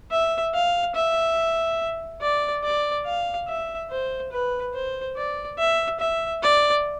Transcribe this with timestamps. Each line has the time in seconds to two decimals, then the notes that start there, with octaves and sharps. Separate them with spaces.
0.11 E5
0.54 F5
0.96 E5
2.21 D5
2.64 D5
3.06 F5
3.48 E5
3.91 C5
4.32 B4
4.74 C5
5.17 D5
5.58 E5
6.00 E5
6.43 D5